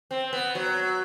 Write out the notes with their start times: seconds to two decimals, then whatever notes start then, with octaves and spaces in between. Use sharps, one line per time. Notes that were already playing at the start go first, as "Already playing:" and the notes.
0.11 C4
0.33 B3
0.55 F#3